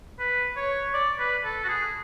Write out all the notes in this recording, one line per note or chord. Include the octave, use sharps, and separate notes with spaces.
B4
C#5
D5
B4
A4
F#4
G#4